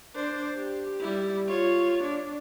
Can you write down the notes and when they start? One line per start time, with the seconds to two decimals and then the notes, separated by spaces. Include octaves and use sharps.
0.15 D4 C5
0.56 G4
1.00 G3 E4
1.48 F4 C#5
2.03 D4